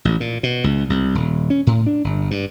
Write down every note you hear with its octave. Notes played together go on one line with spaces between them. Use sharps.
A1
A#2
B2
C#2
C2
D#1
C#4
A2
D4
G1
G2